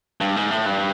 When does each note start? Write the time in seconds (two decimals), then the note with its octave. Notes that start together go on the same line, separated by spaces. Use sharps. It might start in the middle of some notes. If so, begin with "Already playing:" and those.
0.21 G2
0.36 G#2
0.51 A2
0.66 G2